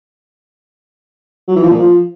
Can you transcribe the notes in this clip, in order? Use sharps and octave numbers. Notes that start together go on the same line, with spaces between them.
F#3
E3
F3
A#2
F3